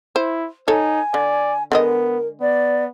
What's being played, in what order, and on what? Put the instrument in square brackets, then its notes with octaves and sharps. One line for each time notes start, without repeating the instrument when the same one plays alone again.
[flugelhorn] E4 [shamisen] C5
[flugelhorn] D#4 [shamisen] A4 C#5 [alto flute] G#5
[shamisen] D3 [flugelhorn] D5
[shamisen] D3 G#3 D#5 [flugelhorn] B3 [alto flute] A#4
[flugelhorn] B3 [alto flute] D5